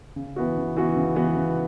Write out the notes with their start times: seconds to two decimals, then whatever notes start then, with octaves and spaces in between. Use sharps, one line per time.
0.16 C#3
0.36 E3 B3 F#4
0.57 C#3
0.76 E3 B3 F#4
0.96 C#3
1.15 E3 B3 F#4
1.36 C#3